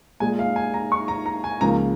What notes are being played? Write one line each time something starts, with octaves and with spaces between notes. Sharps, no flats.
A#2 G#3 G#5
F5
G#5
A#5
C#6
A#5
A#5
G#5
C#2 C#3 F3 A#3 A#5